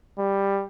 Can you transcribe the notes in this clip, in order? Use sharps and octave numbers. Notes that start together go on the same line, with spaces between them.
G3